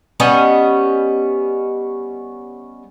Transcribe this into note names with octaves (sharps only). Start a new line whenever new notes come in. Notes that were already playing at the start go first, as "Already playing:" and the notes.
G3 B3 C#4 D#5